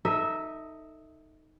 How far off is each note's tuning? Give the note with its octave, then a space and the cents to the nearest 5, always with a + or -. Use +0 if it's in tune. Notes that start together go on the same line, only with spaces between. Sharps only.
D#4 +0 A4 +30 E5 -15